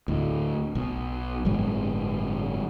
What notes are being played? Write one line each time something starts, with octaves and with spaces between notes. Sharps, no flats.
D2 A2
B1 B2
G1 A2 F#3 G#3